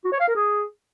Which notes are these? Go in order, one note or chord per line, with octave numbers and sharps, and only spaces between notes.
F#4
C#5
F5
A#4
G#4